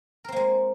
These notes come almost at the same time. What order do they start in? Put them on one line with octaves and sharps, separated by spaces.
A#4 C4 A#3 G#3